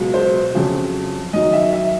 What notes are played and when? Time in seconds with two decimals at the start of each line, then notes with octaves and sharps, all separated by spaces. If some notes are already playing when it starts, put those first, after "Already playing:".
Already playing: C#2 B2 F#3
0.14 C5
0.54 F2 C#3 F#3
1.33 F#2 D#3 F#3 D#5
1.53 E5
1.73 E5